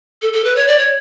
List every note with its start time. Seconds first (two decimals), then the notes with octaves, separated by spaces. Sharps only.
0.22 A4
0.33 A4
0.44 B4
0.56 C#5
0.67 D5
0.78 C#5